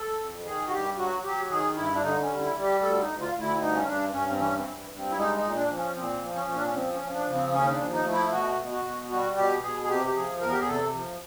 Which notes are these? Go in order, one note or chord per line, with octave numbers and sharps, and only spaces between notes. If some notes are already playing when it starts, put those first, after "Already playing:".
Already playing: A4
F2
D#3 G#4
F#4
G2 G4
F#3 F#4
F#3 G4
D#3 G#4
G2 E4
D4
D3 D#4
C#4
G3
E4
G3
G4
D2 A4
D#4
D2
F4
D2
E4
G2 D#4
C#4
G2 D4
G2 C#4
C4
E3 C#4
C4
G2
G2
C4
E4
G#3 D#4
D#4
A#2
D4
F3
C#4
A#2 C4
F3
C#4
A#2
D4
C#4
F3 C4
C#4
F3
D4
C#3
C4
D#2 C#4
D4
F3
D#4
A3
E4
B2 F#4
B2
F#4
B2
G3 F#4
B2 G4
B2 G#4
G#4
C3 G4
G4
F3 G#4
E2 A#4
G4
G#4
C3 A4
F3